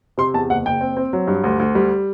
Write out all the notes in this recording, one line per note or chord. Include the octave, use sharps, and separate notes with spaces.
C3 C6
E2 A5
F#1 F#5
F#1 G5
C4
C4
F#3
G2
D2
D2
G3